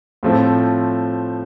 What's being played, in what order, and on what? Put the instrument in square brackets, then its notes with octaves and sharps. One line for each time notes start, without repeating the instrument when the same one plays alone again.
[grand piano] A2 F3 A3 C4